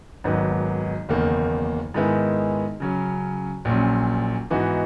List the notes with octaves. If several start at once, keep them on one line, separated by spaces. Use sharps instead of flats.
G#1 G#2 D#3 F#3 B3
F#1 E2 D#3 A#3
G#2 D#3 G#3 B3 E4
C#3 F#3 C#4
A#1 A#2 F#3 C#4
G#2 E3 B3 D#4 F#4